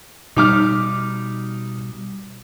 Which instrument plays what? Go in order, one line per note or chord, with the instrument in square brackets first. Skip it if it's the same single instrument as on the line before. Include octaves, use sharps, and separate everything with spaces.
[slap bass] B2 G3 [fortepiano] D#4 D6 F6